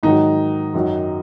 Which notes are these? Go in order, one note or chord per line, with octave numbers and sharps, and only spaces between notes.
G#2 D#3 F#3 D#4
F#2 D#3 F#3